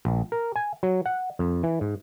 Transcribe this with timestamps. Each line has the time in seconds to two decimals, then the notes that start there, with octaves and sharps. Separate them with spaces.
0.05 A#1
0.32 A#4
0.56 G#5
0.83 F#3
1.06 F#5
1.39 F2
1.63 E3
1.81 G#2